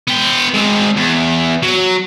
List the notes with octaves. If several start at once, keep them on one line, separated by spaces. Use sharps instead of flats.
B3 G5
G#3 C4
E2
F#3